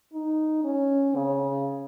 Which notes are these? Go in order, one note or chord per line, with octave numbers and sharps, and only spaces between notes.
D#4
C#4
C#3